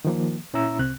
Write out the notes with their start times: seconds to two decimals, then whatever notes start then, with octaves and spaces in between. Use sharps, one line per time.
0.05 D#3 F3 A#3
0.53 A#2 C#4 E4 E5 A#5 E6
0.79 C2 C3 C4 F#6